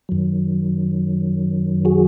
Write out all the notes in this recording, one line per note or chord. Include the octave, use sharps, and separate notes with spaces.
F#2 D#3 F#3
F#4 G#4